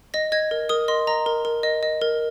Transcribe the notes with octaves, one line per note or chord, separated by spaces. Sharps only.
D#5 A#6
D#5 G#6
A#4
A#4 D#6
D#5 C6
D#5 A#5
A#4
A#4
D#5
D#5
A#4